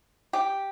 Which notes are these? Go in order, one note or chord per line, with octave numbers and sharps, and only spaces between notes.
G4